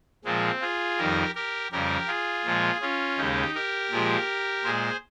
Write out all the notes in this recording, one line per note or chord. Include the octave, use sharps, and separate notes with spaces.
A#2 F3 G#3 C4
F4 G#4
F2 D#3 G3 G4 A#4
G4 A#4
F2 C#3 G3 G4 A#4
F4 G#4
A#2 F3 G#3
C#4 F4
D#2 C#3 G#3 D#4 G4
G4 A#4
A#2 F3 G#3
A#2 G#3 G#4 C5